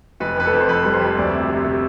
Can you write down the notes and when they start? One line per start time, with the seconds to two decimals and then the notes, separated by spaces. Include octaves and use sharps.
0.20 F1 B4
0.37 F2 B4
0.45 A4
0.53 F2
0.60 C5
0.69 F2 B4
0.85 G3
0.93 C5
1.01 F2
1.17 D2 D5
1.33 C3
1.49 C3
1.65 C3